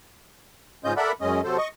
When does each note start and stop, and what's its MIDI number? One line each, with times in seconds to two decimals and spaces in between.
0.84 0.93 44
0.84 0.93 49
0.84 0.93 61
0.84 0.93 65
0.84 0.93 75
0.84 0.93 91
0.97 1.12 69
0.97 1.12 70
0.97 1.12 74
0.97 1.12 76
0.97 1.12 78
0.97 1.12 83
1.21 1.41 42
1.21 1.41 56
1.21 1.41 61
1.21 1.41 75
1.44 1.57 48
1.44 1.57 54
1.44 1.57 69
1.44 1.57 72
1.58 1.68 75
1.58 1.68 85